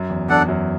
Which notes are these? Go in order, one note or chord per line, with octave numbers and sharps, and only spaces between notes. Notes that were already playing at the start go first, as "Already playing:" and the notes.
Already playing: F#2
E2
E2 D4 A4 D5 F#5
F#2